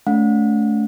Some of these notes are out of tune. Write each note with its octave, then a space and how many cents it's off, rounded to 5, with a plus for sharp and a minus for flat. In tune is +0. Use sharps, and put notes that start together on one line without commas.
A3 -20 C#4 +40 F#5 -35